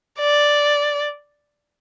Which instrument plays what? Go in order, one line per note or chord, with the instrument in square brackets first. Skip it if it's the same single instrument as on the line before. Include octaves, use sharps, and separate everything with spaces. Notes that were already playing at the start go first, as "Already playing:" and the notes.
[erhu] D5